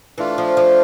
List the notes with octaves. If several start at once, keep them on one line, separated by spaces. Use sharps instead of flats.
E3 A3 D4 F4
F3
F3